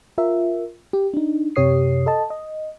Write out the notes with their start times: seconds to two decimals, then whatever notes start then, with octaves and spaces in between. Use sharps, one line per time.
0.18 F4 A#4 E5
0.93 G4
1.14 D4 D#4
1.56 F#2 C3 G4 C#5 D#6 C7
2.06 A4 D#5 A5
2.30 D#5